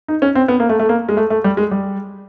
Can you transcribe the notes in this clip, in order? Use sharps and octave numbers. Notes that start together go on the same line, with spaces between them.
D#4
C#4
C4
B3
A#3
A3
A3
A#3
G#3
A3
A3
G3
G#3
G3